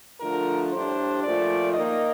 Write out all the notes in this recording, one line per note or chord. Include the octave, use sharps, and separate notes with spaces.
D3 F3 A3 A#4
A2 G3 D4 C5
A#2 F3 A3 D5
D#3 A#3 D#4 D#5